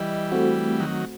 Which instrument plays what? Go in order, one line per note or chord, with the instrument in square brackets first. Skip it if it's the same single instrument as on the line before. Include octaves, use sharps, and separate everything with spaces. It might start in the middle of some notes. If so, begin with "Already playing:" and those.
Already playing: [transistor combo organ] E3 G3 [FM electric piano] D#5
[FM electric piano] A3 C4 F#4
[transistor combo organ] D#3 F#3